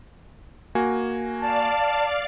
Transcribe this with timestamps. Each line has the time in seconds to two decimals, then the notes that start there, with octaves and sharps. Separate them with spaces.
0.75 A#3 F#4 G#5
1.41 D5 F5 A5